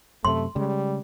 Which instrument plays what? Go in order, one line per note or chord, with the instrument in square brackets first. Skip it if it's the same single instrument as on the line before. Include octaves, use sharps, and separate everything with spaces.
[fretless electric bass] F#2 C3 [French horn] A3 [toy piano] C6
[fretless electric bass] C#3 G#3 [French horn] G3